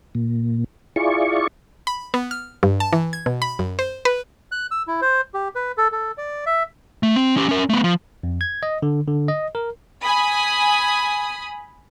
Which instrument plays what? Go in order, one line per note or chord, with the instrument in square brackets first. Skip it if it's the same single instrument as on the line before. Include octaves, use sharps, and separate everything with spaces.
[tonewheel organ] A#2
E4 F4 G#4 D5 C#6
[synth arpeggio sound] B5
B3
F6
G2
A5
E3
G#6
B2
B5
F#2
C5
B4
[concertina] F#6
E6
E4
C5
G4
B4
A4
A4
D5
E5
[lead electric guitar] A3
C4
C#4 G4
C#4 A#4
A3 B3
F3
[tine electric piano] F2
G#6
D#5
D3
D3
D#5
A#4
[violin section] G#5 B5 D#6